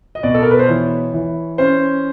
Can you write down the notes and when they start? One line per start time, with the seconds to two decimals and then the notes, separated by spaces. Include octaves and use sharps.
0.15 D#5
0.23 B2 D5
0.34 A4
0.43 A#4
0.51 B4
0.59 C5
0.68 E3 C#5
1.13 E3
1.58 C#4 C5